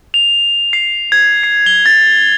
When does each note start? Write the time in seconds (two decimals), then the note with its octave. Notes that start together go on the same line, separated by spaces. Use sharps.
0.14 F7
0.73 C7
1.12 G#6
1.43 C7
1.66 G7
1.86 A6